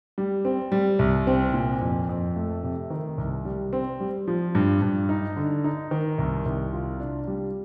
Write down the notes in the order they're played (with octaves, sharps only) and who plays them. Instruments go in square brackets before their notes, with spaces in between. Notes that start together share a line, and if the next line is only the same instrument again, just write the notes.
[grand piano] G3
C4
G3
C2
C4
A#2
F2
F2
A3
C3
D#3
C2
G3
C4
G3
F3
G2
G2
D#4
D3
D#4
D#3
C2
C2
F4
D4
G3